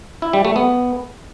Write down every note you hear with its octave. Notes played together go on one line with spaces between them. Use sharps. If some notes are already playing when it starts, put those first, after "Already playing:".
E4
G3
A3
B3